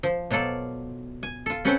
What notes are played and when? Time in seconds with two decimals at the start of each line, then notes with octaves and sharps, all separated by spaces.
0.03 F3
0.31 B2 F#3 F4 A4 D5
1.23 G#5
1.46 F4 A4
1.65 C4 C#4 A4 B4 F#5 G5